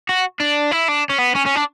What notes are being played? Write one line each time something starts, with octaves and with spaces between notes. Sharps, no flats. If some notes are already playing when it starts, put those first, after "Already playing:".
F#4
D4
E4
D4
C#4
B3
C#4
C#4
D4